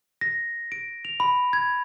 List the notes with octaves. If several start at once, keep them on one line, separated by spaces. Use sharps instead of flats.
A#6
D7
F7
B5
G#6